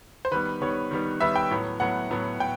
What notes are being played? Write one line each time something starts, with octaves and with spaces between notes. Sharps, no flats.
C5
D#3 G3 B3 B4
D#3 G3 B3 C#5
D#3 G3 B3
D#3 G3 B3 E5
G5
A2 F#3 B3
A2 F#3 B3 F#5
A2 F#3 B3
A2 G5